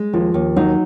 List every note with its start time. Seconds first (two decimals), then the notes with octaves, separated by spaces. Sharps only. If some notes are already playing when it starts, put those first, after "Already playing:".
Already playing: G#3
0.13 D#2 F3
0.34 D#2
0.56 F#3 D#4